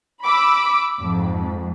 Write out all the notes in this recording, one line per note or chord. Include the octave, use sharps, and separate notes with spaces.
B5 D6 E6
F2 G#2